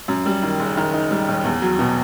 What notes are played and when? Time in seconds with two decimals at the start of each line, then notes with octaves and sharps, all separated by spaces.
0.08 F#2
0.26 G3
0.43 D#3
0.59 F#1
0.77 D#3
0.94 D#4
1.11 G3
1.29 D#2
1.44 E2
1.62 F#3
1.79 B2